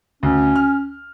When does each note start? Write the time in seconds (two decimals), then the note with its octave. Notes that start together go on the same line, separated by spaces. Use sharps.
0.23 D2 C#4
0.56 F6